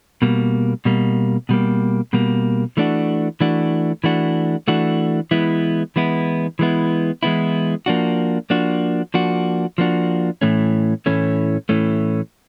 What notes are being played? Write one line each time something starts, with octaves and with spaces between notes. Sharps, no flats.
B2 G3 A#3
B2 G3 A#3
B2 G3 A#3
B2 G3 A#3
E3 A3 D4 F#4
E3 A3 D4 F#4
E3 A3 D4 F#4
E3 A3 D4 F#4
E3 G#3 B3 E4
E3 G#3 B3 E4
E3 G#3 B3 E4
E3 G#3 B3 E4
F3 A#3 D4 F#4
F3 A#3 D4 F#4
F3 A#3 D4 F#4
F3 A#3 D4 F#4
A2 E3 A3 C#4
A2 E3 A3 C#4
A2 E3 A3 C#4